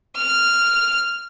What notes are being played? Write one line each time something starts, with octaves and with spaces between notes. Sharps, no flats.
F6